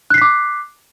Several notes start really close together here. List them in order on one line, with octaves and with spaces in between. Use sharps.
F#6 C7 B6 D6